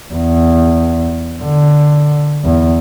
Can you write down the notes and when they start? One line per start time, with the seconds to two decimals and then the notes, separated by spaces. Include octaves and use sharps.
0.14 E2
1.42 D3
2.45 E2